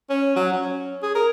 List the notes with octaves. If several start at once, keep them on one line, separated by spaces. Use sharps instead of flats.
C#4
F#3
C#4
G#4
A#4